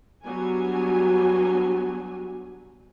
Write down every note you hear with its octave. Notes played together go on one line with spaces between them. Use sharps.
F#3 G3 B3 D4 G#5